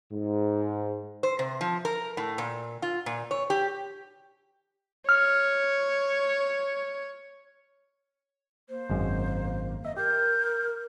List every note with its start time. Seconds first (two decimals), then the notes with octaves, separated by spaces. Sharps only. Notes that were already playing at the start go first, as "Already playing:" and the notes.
0.13 G#2
1.23 C5
1.39 C3
1.61 F3
1.85 A#4
2.17 A2
2.38 A#2
2.82 F4
3.06 A#2
3.31 C#5
3.50 G4
5.09 C#5 F6
8.69 A#3 C5
8.90 G#1 F#2 G#3
9.85 D#5 E5
9.97 G4 A#4 G6